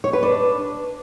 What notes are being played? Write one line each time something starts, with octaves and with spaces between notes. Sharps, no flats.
C#5
B4
D4